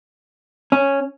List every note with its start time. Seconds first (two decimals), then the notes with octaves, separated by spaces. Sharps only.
0.72 C#4